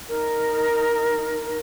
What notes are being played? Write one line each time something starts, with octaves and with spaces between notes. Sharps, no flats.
D#4 A#4